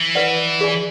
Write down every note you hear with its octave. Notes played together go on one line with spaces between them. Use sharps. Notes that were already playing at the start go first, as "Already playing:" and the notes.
Already playing: E3
B4 D5 F#5
G#4 D5 G#5 B5